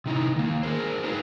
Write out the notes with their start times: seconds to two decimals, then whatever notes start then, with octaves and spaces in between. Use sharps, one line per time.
0.06 C3 D#4 E4
0.36 D#3 A#3
0.63 G#4 A#4 C5
1.04 D#4 F4 F#4 G#4 B4